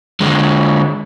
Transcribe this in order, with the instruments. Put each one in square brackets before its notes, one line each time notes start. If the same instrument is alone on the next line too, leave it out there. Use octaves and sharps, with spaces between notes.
[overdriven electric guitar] D3 G#3